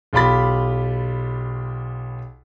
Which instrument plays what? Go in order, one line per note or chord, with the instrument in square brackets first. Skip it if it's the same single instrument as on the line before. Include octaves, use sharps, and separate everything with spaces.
[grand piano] B1 F4 G4 B5 A6